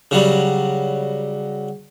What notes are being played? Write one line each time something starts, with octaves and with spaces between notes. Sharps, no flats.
C#3 F#3 G3